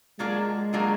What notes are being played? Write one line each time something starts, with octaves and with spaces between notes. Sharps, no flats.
F#3 G#3 A#3 D4 F4 G#4
F#3 A#3 D4 F4 G#4